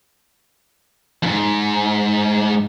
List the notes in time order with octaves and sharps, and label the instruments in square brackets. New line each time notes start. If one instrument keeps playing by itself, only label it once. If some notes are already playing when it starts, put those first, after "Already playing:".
[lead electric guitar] F2 G#2